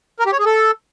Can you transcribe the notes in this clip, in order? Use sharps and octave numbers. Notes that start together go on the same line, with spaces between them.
A#4
G4
C#5
G#4
A4